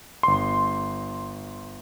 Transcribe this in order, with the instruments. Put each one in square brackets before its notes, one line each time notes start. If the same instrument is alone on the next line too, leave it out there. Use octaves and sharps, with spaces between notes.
[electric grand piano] G1 C6